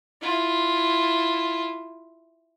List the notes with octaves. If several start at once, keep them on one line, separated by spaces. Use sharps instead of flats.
E4 F4